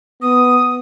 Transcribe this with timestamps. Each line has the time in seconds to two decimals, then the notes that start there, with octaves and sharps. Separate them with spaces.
0.22 B3 D#6